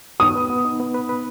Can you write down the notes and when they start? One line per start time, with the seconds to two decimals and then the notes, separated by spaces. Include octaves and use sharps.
0.20 B3 D#6
0.35 B4
0.50 B3
0.65 D#4
0.80 B3
0.94 B4
1.09 B4